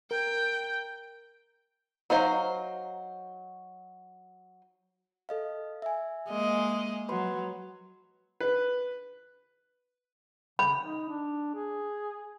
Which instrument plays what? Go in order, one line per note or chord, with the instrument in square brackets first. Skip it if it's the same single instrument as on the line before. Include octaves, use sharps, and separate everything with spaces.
[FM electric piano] A#4 [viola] G5
[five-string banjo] F#3 D#4 C5 F5
[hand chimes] A4 D#5 F5
E5 G#5
[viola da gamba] G#3 A#3 D#5
[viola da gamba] F#3 [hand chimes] B4 B5 C6
[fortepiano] B4
[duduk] C#3 [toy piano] B5
[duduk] D#4
D4
G#4